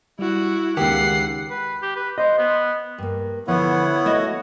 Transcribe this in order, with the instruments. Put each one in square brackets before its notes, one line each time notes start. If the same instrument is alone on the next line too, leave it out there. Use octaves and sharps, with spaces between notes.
[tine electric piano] G3 [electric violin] E4 F#4
[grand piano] C#2 G4 [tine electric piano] D#3 [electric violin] F#5 C7
[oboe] B4
G4
B4
[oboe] C5 [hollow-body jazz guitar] D#5
[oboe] B3
[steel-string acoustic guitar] G2 A#3
[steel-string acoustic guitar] D3 F3 [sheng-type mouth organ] B3 [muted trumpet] E4 [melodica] C#5 F#5
[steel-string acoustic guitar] A3 F#4 D#5